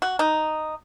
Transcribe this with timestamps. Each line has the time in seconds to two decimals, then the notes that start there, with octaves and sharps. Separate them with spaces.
0.02 F#4
0.19 D#4